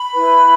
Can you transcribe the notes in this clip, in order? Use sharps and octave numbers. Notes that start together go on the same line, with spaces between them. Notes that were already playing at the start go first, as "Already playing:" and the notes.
Already playing: B5
E4 B4